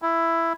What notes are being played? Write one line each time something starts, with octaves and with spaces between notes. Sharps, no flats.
E4